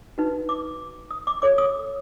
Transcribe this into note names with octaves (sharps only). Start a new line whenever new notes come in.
D#4 F#4 B4
D6
D#6
D6
F#4 A4 C#5 D6
D#6